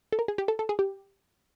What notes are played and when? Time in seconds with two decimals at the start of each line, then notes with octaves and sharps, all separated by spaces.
0.12 A4
0.19 A#4
0.28 G#4
0.38 G4
0.48 A4
0.59 A4
0.69 G#4
0.79 G4